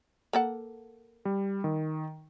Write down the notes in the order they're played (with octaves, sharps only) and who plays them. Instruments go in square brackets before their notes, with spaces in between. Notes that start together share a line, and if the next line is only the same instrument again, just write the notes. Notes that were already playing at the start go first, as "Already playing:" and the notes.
[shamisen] A#3 A4 F#5
[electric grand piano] G3
D#3